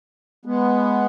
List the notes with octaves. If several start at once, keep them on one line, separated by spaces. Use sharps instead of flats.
G#3 B3